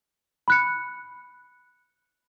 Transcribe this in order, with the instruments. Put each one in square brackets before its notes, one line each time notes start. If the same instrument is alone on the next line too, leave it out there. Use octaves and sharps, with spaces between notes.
[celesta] B5 F#6 C#7